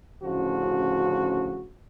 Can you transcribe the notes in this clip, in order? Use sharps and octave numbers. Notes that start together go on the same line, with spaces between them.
A1 D2 C#3 F3 F#4